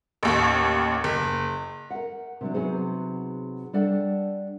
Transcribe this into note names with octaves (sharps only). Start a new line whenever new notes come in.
A1 D#2
F#1
A#4 F#5
C3 F#3 D4
C3 F#3 B3 D#4 G#4 C5
G3 D4 A4 D5 F#5 G5